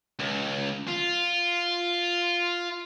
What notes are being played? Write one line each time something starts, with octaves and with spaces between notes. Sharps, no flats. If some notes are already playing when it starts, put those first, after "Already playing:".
C#2
F4